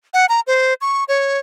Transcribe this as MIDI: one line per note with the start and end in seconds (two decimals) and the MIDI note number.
0.14 0.26 78
0.29 0.40 82
0.47 0.74 72
0.81 1.04 85
1.08 1.39 73